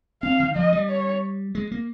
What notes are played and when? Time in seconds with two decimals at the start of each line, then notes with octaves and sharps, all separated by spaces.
0.23 C4 F5
0.40 D#3
0.56 F3 D#5
0.72 G3
0.89 C#5
1.55 G#3
1.71 A#3